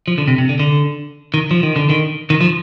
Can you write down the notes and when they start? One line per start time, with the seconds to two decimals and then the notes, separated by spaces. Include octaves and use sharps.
0.08 F3
0.18 D3
0.28 C3
0.38 C3
0.49 D3
0.60 D3
1.34 D#3
1.51 F3
1.63 D#3
1.76 D3
1.90 D#3
2.30 D#3
2.41 F3